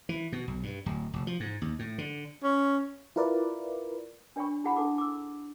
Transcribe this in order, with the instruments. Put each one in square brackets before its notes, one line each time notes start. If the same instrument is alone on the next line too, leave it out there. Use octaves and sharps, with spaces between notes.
[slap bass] E3
B2
B1
G2
D1
F1
F3
G#2
D#2
A2
D3
[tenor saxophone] C#4
[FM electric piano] E4 F4 A#4 B4 D5
[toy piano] D4 C#5 D5 G5 B5 C#6
D#4 E4 G#4 F#5 A5 B5
D4 A4 F#5 D6
D6 E6